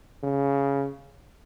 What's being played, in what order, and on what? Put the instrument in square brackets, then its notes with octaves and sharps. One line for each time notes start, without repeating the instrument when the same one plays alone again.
[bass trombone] C#3